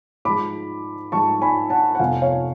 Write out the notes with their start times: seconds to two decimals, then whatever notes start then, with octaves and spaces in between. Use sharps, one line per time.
0.25 G#2 F3 G#3 B5 D6
1.12 G#2 F3 G#3 A5 C#6
1.42 G#5 B5
1.70 F#5 A5
1.95 F#5
1.99 F1 F2 F3 B3 F5 G#5
2.22 C#5 F5